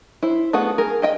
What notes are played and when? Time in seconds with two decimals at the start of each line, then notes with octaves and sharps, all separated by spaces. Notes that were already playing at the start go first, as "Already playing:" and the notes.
0.23 E4 C5
0.53 A3 B3 F#4 G#4 F#5
0.78 G#4 A#4
1.02 G4 D#5 G5